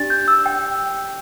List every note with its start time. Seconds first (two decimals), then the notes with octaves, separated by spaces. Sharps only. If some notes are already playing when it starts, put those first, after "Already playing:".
Already playing: D4 G4 D5 A6
0.10 G6
0.28 E6
0.46 G5